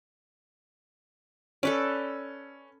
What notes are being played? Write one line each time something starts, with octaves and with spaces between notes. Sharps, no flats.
C#4 A4 B4 D5